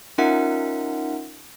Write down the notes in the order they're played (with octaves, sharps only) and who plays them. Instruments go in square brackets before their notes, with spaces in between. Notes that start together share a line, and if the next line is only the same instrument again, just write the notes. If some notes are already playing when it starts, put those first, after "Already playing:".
[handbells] C#4 D#4 F4 A#4 E5 F#5